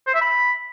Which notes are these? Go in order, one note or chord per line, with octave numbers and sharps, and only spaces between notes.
C5
E5
B5